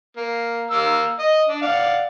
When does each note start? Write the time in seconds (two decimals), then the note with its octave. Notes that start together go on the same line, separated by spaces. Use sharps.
0.17 A#3
0.71 A#3 E6
1.19 D#5
1.49 D4
1.62 D5 F5 F#5